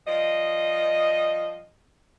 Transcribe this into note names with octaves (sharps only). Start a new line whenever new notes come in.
F3 G3 D#5